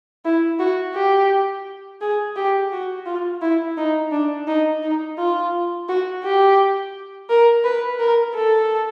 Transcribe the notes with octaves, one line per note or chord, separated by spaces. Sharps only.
E4
F#4
G4
G#4
G4
F#4
F4
E4
D#4
D4
D#4
D#4
F4
F#4
G4
A#4
B4
A#4
A4